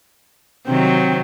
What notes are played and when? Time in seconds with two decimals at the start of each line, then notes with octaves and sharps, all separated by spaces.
0.66 C3 D#3 F#3 C4 G5